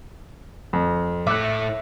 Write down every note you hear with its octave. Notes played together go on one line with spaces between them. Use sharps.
F2
A2 A3 E5 D6 F#6